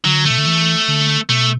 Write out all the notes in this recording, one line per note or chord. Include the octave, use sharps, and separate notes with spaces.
D3 F#3
A3
B2
D3
E3
D3
B2 A3